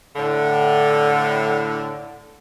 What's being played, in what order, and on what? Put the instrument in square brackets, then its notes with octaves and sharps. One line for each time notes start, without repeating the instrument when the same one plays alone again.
[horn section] A2 D3